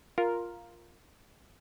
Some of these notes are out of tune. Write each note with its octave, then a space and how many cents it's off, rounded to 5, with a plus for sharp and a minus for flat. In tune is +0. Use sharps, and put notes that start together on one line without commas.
F4 +0 A#4 +0